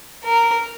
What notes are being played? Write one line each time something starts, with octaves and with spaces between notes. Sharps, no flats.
A#4